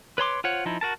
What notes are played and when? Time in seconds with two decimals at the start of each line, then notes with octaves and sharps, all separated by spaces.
0.18 B4 C#5 C6 D6
0.44 F4 C5 C#5 F#5
0.65 F3 D#4 E4
0.81 F#4 A#4 A5